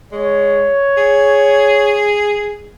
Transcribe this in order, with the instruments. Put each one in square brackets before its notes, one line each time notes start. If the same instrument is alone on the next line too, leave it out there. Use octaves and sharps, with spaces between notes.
[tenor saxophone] G#3 [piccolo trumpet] C#5
[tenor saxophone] G#4